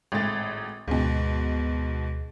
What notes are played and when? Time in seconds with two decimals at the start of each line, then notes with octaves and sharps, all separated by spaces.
0.12 G#1 A2 A6
0.88 D2 G#2 B2